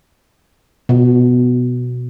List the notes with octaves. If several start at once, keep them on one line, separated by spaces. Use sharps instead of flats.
B2